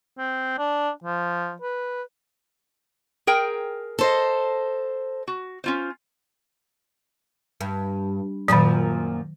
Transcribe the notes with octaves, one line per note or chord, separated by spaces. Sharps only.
C4
D4
F3
B4
G#4 A#4 G5
A4 C5 D#5
F#4
C#4 F4 C5
G2
F#2 A#2 D#3 F3 F#3